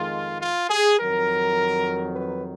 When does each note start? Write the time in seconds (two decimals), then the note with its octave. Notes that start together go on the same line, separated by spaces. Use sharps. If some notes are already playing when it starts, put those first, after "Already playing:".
Already playing: F2 D#3 G#3 F4
0.41 F4
0.70 G#4
0.99 F2 D#3 F#3 A#4
2.14 B4